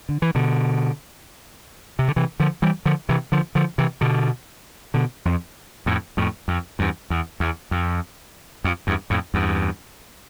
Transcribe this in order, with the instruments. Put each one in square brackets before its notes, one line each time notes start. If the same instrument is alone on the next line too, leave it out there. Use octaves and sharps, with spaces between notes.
[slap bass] D3
E3
B2 D3
C3
D3
C3 E3
D3 F3
E3 G3
D3 F3
C3 E3
D3 F3
D3 F3
C3 E3
B2 D3
B2 D3
F2
F2 A2
F2 A2
F2
E2 G2
E2
E2
F2
F2
E2 G2
F2 A2
E2 G2